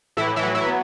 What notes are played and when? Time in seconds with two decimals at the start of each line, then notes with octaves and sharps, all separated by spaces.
0.17 A2 E3 E4
0.36 E3 E4
0.43 F#3
0.55 E3 E4
0.67 B3